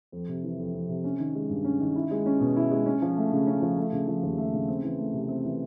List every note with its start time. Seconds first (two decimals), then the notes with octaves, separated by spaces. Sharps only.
0.12 F2
0.28 C3
0.43 E3
0.59 F2
0.74 F2
0.89 C3
1.04 C#4
1.19 D#3
1.35 G#3
1.50 G2
1.64 C#4
1.80 D#3
1.96 E4
2.11 G#3
2.26 C#4
2.40 B2
2.56 E4
2.71 G#3
2.86 C#4
3.02 F3
3.17 A3
3.32 C#3
3.47 C#4
3.62 F3
3.77 A3
3.93 C#3
4.08 F3
4.23 D#2
4.38 A3
4.54 C#3
4.68 C4
4.83 E3
4.99 A3
5.13 C3
5.29 C4
5.44 E3